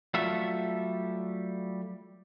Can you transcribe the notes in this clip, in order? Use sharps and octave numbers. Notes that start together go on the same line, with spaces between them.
F#3 G3 A3 F4 A4 E5